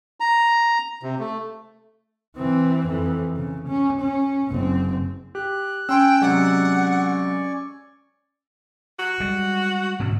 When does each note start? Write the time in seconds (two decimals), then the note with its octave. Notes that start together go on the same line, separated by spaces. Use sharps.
0.20 A#5
1.03 C3
1.19 A3
2.37 E3 C4
2.86 F2 E3
3.36 C#3
3.68 C#4
4.01 C#4
4.51 F#1 C4
5.35 G4 F#6
5.89 C#4 G5 G#5 C6 E6
6.22 C3 F#3 G#3 D5 F#5 G#5 C#6
8.99 F#4
9.20 G3 G#3
10.00 G#2 B2 D3